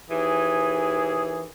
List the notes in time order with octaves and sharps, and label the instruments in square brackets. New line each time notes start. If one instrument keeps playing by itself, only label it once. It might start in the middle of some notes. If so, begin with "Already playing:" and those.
[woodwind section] D#2 G#4 [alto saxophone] E3